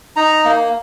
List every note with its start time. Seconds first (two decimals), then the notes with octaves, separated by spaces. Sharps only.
0.16 D#4 A#5
0.45 A#3